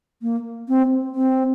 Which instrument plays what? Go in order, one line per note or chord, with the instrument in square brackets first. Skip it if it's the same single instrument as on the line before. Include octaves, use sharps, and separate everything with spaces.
[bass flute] A#3
C4
C4